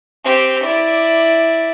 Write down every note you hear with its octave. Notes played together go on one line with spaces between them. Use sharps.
C4 G4
E4 D5